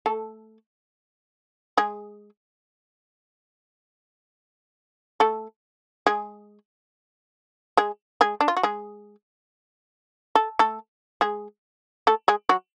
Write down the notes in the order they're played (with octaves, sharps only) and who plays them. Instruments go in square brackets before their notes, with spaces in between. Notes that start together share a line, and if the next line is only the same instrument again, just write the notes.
[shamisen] A3 A4
G#3 G#4
A3 A4
G#3 G#4
G#3 G#4
G#3 G#4
D4
F4
F#4
G#3 G#4
A4
A3 A4
G#3 G#4
A3 A4
G#3 G#4
F#3 F#4